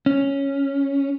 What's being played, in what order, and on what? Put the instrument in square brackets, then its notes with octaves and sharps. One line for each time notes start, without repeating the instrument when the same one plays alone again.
[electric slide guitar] C#4